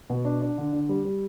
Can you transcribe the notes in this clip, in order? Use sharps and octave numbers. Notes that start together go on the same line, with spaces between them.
B2
D4
D4
D3
D3
G3
G3